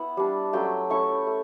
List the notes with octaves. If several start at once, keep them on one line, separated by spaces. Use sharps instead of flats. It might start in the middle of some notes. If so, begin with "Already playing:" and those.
Already playing: B3 E4 E5 F#5
G3 D4
F#3 A3 C#4 G5
A3 C#4 E4 C#6
A3